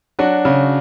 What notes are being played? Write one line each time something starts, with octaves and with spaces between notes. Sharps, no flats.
F#3 D4 F#4
C#3